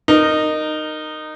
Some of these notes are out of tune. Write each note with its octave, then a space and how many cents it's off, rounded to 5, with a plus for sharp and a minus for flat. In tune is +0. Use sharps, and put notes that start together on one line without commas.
D#4 -15 A#4 -5